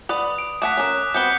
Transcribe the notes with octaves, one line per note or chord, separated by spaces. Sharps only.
B4 D5 F#5 D#6
D7
A3 F#5 A5 D6 F#6 B6
C#4 A#4
B3 C4 F#4 G6 C#7 G7